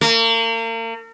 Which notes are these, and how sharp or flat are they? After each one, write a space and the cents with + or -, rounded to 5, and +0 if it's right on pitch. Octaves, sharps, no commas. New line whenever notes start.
A#3 -40